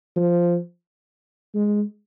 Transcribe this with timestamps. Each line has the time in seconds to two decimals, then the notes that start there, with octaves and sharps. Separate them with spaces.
0.16 F3
1.54 G#3